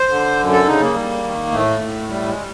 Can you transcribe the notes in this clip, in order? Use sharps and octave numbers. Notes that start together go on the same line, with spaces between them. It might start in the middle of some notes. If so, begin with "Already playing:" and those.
Already playing: C5
D3
F#2
A4
C#3 D#4
A#3
G3
D#3
A2 A3
A2
G3 A3
G#3
G3